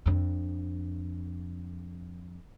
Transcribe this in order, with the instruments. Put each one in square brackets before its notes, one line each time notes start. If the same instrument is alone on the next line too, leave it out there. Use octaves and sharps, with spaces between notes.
[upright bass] F2 D4